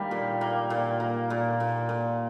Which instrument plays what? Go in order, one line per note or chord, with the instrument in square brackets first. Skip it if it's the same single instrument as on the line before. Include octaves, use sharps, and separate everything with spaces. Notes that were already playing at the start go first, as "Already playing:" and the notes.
Already playing: [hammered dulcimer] D#3 G3 A#3 D#4
A#2
A#3
A#2
A#3
A#2
A#2
A#2